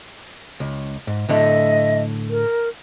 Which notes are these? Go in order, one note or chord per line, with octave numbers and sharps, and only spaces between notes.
C#2
G#2
A2 D3 A3 D#5 E5
A#4